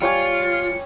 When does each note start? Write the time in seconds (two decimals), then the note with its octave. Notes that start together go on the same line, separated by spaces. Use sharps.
0.02 G3 F4 C#5 G#5 C#7